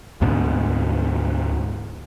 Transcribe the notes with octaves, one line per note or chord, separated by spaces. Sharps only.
D2 G#2 B2 D3